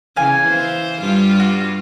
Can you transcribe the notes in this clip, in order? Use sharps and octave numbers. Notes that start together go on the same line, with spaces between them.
C#3 E3 F5 G#5
E3 C5
G2 G3 F4
F#4